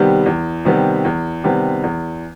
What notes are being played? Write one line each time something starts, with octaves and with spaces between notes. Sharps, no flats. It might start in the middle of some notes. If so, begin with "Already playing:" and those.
Already playing: C3 D#3 G3 B3
E2
C3 D#3 G3 B3
E2
C3 D#3 G3 B3
E2